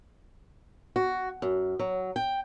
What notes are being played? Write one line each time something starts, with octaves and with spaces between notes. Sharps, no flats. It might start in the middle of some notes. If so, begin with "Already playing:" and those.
F#4
F#2
F#3
G5